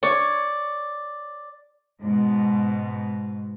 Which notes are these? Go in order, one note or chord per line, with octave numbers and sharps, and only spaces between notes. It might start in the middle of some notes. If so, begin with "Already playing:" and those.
C#5 D5
G#2 B2